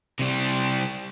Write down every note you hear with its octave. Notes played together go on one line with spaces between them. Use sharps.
C3 G3